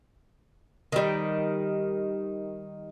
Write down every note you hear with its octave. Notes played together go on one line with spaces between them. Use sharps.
D#3 G3